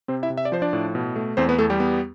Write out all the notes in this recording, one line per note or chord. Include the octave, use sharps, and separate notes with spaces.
C3 C4 C5
E4 E5
C3
E5
D5
F3 C5
D4 D5
A2
B2
A3
E2 C4 C5
B3 B4
E2 A3 A4
G3 G4
B3